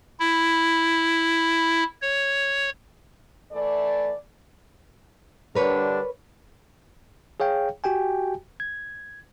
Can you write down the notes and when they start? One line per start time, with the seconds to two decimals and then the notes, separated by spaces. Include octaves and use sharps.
0.19 E4
2.02 C#5
3.52 E3 A3 D5
5.55 D3 G3 D4 A#4 B4 C#5
7.40 G#4 C#5 F5 G5
7.84 F#4 G4 G5 G#5
8.60 G#6